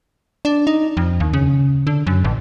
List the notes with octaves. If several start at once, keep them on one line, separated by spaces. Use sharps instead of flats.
D4
D#4
F2
D#2
C#3
D3
F#2
A1